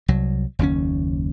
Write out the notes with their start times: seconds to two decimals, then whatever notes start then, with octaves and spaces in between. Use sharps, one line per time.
0.08 C2 F#3
0.59 F#1 D#2 C#3 C#4